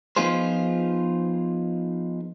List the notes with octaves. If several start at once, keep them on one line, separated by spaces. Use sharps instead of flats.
F3 B3 D#4 F4 G#4 C5